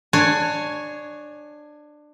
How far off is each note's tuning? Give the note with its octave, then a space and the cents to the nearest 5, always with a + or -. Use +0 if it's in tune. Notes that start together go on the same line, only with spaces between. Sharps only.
D4 +20 C#5 +0 G#5 +15